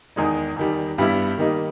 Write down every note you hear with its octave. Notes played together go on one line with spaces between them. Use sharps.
E2 D#3 G#3 D#4
E2 D#3 G3
G2 G3 B3 E4
D#3 G3 A#3 D#4